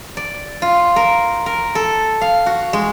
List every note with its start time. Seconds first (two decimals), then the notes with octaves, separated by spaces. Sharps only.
0.17 D5
0.62 F4
0.96 A#4
1.46 A#4
1.75 A4
2.21 F5
2.46 F#4
2.73 G#3